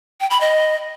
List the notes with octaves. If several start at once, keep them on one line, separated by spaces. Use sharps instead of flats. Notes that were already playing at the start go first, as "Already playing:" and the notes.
G5
B5
D#5